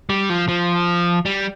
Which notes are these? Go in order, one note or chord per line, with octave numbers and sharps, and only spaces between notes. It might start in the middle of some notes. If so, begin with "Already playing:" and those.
G3
F3
F3
G3